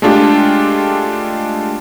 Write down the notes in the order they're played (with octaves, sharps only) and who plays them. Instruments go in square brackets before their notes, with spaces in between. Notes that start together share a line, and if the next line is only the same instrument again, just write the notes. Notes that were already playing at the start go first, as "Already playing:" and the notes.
[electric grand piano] G#3 A3 D4 F4 G4